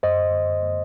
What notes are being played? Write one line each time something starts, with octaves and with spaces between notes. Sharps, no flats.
F#2 C5 D#5